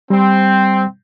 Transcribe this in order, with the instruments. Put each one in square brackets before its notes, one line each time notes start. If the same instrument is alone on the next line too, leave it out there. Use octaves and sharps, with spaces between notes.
[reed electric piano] G3 [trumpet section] C4